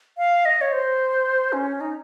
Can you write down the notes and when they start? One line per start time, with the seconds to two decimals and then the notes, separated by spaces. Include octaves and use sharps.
0.18 F5
0.45 D#5
0.61 C#5
0.72 C5
1.53 C#4
1.81 D#4